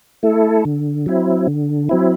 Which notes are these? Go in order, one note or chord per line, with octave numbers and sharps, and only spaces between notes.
A3 E4 A4
D3
F#3 C4 E4
D3
F#3 C4 E4